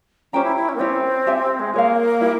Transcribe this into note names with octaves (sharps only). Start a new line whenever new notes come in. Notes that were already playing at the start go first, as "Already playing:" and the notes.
C#4 G4 C5 G5 A#5
E4
E4
C#4
A#3
C4 C#4 E4 G4 C#5
G4 C#5 E5 G#5
G#3
A#3 G#4 C#5 F5
E4 G4 A#4